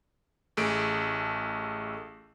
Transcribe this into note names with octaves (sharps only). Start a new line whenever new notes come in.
A1 A3 G#4 D7